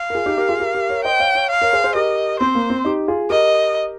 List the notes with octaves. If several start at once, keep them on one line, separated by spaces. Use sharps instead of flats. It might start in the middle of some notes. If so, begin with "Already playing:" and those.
Already playing: F5
A#4
F4 G#4
D#4 G4
G4 A#4
F4 G#4
G4 A#4
G4 A#4
A#4 C#5
C5 D#5 G5
C#5 F5
C#5 F5
F5
A#4 C#5
G#4 C5
G#4 C5
G4 A#4 D#5
C4 C5
A#3
C4
D#4 G4
F4 G#4
G4 A#4 D#5